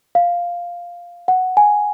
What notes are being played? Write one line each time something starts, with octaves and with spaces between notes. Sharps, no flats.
F5
F#5
G#5